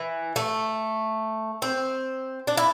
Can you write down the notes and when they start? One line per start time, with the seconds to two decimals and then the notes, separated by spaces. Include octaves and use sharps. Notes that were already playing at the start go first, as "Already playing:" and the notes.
Already playing: E3
0.36 A3
1.62 C4
2.47 D4
2.57 E4